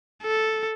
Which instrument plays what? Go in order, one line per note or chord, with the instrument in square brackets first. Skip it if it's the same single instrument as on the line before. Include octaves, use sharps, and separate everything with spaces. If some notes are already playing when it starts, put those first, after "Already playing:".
[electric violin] A4